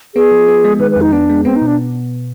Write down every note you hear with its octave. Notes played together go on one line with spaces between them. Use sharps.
B3 G#4
F3
B3
G#3
D#3 B4
B4
F2
D#4
B3 D4
G#3
B3 C4
D#4
B2
D4